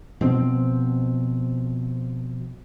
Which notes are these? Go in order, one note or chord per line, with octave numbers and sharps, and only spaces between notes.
B2 F3 C4